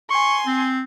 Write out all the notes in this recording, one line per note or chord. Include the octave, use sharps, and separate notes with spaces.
G#5 C6 C#6
C4